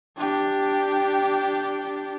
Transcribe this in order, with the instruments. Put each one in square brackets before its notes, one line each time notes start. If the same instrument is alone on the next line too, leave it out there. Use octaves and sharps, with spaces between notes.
[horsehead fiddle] D4 G4